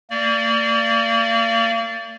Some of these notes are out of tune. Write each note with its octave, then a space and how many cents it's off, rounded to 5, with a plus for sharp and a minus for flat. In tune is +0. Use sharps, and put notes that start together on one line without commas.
A#3 -35 D5 +0